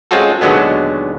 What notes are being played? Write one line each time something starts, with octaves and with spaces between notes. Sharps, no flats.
G#3 C4 C#4 F4 F#4 A4
D#2 B2 D3 F#3 G#3 B3